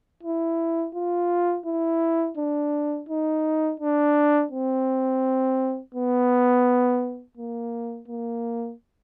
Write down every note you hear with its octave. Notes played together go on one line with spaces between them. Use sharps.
E4
F4
E4
D4
D#4
D4
C4
B3
A#3
A#3